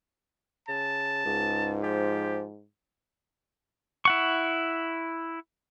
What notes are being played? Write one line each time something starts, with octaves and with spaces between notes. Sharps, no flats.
C#3 A5
C#2 G#2
F3 G4
E4 F#5 C#6